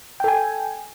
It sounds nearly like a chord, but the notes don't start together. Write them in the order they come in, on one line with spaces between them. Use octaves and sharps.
G5 A4 G#5